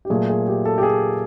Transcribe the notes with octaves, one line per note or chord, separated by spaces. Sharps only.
G4
A#2 F#3 A3 G#4
G#4
G4
A4
G4
G#4